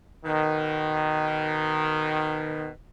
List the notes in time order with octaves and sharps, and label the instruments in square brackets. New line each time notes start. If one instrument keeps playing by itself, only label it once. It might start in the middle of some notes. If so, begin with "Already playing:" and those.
[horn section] B2 D#3